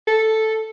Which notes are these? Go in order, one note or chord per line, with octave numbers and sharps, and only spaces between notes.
A4